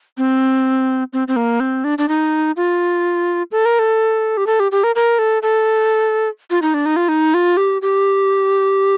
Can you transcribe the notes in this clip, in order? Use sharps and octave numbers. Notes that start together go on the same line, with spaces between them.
C4
C4
C4
A#3
C4
D4
D4
D#4
F4
A4
A#4
A4
G4
A4
G4
G4
A#4
A#4
A4
A4
F4
D#4
D4
D#4
F4
D#4
F4
G4
G4